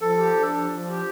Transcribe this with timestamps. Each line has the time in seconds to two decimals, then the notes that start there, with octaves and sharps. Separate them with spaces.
0.01 F3 A4
0.18 G4
0.36 D4
0.52 F3
0.70 F3
0.88 G4